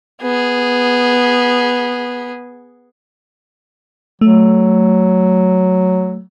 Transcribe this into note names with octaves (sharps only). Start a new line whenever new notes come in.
B3 G#4
F#3 A3